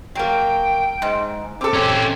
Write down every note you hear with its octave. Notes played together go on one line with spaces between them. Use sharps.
F#3 A#3 G5
G#2
C4 A4 D6
C#4 G4